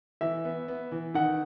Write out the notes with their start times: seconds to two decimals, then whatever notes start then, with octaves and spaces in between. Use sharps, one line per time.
0.21 E3 E5
0.45 B3
0.68 B3
0.92 E3
1.14 D#3 F#5